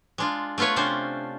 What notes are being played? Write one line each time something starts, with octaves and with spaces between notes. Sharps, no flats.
G#3 D4 F4
A3 B3 F4 B4 C#5
C3 C#4 D4 C5